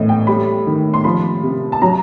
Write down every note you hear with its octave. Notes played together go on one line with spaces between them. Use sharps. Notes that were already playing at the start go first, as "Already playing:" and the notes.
Already playing: A2 E3 D#5
G5
G3 B5
D#3
C6
F3 B5
C3
A5
F#3 A#5